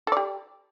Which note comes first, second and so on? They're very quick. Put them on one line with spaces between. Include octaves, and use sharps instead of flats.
A4 D5 G4